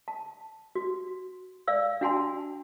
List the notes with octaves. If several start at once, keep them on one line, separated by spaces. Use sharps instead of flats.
A5
F#4
D5 F5 E6
D4 F#4 F#5 G#5 A5 C6